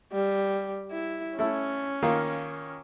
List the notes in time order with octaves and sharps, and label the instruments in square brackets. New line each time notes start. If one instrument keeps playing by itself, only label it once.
[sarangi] G3
E4
[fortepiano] A3 E4 [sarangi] C#4
[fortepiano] D#3 A#3 F4